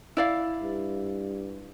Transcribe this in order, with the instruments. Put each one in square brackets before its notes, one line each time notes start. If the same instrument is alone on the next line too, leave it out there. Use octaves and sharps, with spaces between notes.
[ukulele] E4 D5 F5
[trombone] G2